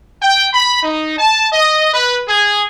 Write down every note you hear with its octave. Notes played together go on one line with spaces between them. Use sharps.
G5
B5
D#4
A5
D#5
B4
G#4